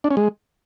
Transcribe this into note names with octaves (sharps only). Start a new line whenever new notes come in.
D4
C#4
G#3